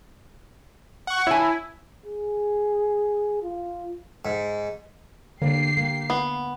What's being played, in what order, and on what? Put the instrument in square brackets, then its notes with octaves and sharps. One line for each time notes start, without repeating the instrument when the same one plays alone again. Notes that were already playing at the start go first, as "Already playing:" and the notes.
[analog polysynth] F#5 C#6
[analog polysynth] E4 [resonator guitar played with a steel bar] C#5 G#5
[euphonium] G#4
F4
[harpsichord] G#2
[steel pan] D3 [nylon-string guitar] A#3 [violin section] G4 C7
[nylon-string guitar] A#3
[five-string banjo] B3